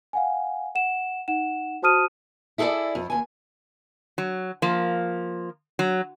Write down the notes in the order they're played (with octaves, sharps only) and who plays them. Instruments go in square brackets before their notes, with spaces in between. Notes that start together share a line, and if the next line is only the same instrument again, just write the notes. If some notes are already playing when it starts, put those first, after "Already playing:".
[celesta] F5 F#5 G#5
F#5 E7
D#4 F#5 E7
F#4 C5 A5 D#6 F6 D#7
[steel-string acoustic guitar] E4 G#4 A4 B4 D5
F2
D#2 G#5
[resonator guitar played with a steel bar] F#3
F3 A#3
F#3